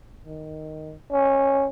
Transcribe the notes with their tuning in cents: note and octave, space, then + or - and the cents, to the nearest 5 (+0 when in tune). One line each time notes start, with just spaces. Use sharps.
D#3 +0
C#4 -15